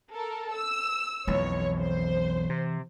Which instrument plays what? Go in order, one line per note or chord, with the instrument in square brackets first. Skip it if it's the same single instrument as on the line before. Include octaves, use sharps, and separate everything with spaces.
[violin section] A4 A#4
E6
[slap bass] B1 F2 [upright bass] E3 [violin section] C#5
[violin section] C5
[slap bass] C3